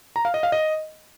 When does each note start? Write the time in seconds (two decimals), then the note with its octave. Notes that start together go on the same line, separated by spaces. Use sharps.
0.16 A#5
0.25 F5
0.34 D#5
0.43 F5
0.52 D#5